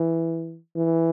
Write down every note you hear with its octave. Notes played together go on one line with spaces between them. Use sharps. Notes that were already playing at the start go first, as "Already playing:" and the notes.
Already playing: E3
E3